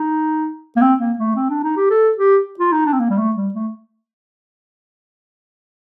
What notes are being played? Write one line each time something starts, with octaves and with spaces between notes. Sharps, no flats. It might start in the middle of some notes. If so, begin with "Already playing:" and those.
Already playing: D#4
A#3
C4
A#3
A3
C4
D4
D#4
G4
A4
G4
F4
D#4
D4
C4
A#3
G3
A3
G3
A3